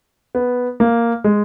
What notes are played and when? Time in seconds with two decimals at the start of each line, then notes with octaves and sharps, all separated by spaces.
0.35 B3
0.80 A#3
1.24 G#3